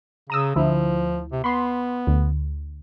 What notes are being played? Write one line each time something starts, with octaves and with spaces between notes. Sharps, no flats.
C#3 A#5 D#6 E6
D2 F3 E4
C3
B3 B5 C6
D2